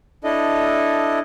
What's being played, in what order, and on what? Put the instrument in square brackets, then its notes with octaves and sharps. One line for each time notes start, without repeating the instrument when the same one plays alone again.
[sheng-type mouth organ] D4 E4 A4 D#5